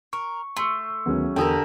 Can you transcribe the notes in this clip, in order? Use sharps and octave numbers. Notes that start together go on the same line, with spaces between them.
A#4 C#6
A3 C6
D2 D#3 F#3 G#3 B3 C#4
E2 D3 G4 A#4 G5 G#5 D#6 E6